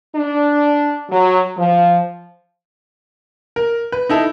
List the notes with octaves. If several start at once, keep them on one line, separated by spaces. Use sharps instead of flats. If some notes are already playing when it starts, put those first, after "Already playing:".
D4
F#3
F3
A#4
B4
D#4 E4 A4